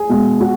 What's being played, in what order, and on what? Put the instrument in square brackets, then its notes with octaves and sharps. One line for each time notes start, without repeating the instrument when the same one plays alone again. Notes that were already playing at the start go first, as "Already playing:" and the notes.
Already playing: [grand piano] G#4
B2 G#3
B2 F#4